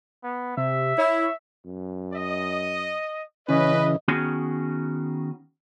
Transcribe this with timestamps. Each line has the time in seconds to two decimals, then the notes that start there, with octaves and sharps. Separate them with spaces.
0.23 B3
0.57 C3 E5
0.98 E4 C#5
1.65 F#2
2.14 D#5
3.49 C#3 E3 C#4 B4 D#5
4.08 D#3 B3 C#4 F#4 G#4